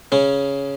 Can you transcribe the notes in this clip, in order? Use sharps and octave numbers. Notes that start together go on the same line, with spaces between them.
C#3 C#4